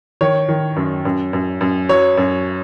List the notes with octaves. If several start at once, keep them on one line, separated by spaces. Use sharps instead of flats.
D#3 C#5
D#3
F#2
F#2
F#2
F#2
F#3 C#5
F#2